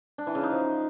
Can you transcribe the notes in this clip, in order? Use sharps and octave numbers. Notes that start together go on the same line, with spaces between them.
D4
E3
C#3
D#4
F3